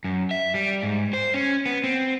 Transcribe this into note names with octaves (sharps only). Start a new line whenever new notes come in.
F#2
E5
G3
G#2
C5
C#4
B3
C4